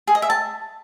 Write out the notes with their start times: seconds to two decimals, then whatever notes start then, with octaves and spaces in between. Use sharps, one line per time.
0.07 G#4
0.15 D#5
0.22 E5
0.30 A5